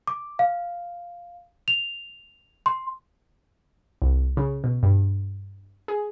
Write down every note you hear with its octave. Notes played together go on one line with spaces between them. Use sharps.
D6
F5
F7
C6
C2
C#3
B2
G2
G#4